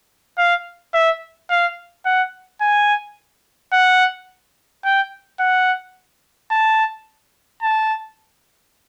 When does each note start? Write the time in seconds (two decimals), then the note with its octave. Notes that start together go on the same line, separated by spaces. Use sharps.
0.38 F5
0.94 E5
1.50 F5
2.06 F#5
2.61 G#5
3.73 F#5
4.85 G5
5.40 F#5
6.51 A5
7.63 A5